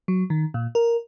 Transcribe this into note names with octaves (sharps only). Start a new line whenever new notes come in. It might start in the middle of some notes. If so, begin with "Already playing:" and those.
F#3
D#3
A#2
A#4